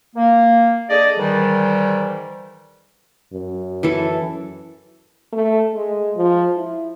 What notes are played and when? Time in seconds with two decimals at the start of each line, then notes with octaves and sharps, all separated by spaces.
0.16 A#3
0.90 D4 G#4 A4 D5 D#5
1.18 G#2 D#3 E3 G3
3.34 F#2
3.83 E3 A4
5.33 A3
5.74 G#3
6.16 F3
6.57 E4